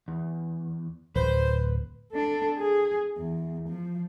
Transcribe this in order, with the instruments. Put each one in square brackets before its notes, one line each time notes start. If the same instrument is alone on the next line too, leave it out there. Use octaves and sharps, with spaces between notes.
[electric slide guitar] E2
[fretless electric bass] D1 [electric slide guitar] B4 [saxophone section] C5
[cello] D4 A4
G#4
E2
F3